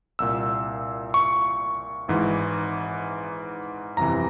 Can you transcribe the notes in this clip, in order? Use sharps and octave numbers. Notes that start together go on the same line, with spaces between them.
C2 A#2 E6
C#6
G#1 G#2 E3
G1 F2 C3 E3 A#5